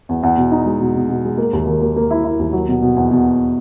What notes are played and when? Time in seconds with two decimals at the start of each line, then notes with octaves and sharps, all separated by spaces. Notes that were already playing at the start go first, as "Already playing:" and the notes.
0.09 E2
0.23 E2
0.37 B2
0.52 D#4
0.66 G#3
0.80 B2
0.95 B2
1.09 B2
1.24 G#3
1.38 A#3
1.53 D#2
1.67 D#3
1.82 A#3
1.96 A#3
2.11 E4
2.24 E4
2.39 D#2
2.53 F#3
2.68 B2
2.82 B2
2.96 E2
3.11 B2